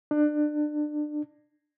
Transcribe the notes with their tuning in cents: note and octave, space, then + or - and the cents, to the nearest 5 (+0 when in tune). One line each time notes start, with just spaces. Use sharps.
D4 +30